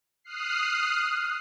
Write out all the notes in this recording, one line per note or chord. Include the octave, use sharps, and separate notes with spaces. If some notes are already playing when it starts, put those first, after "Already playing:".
D#6 F6 F#6 C7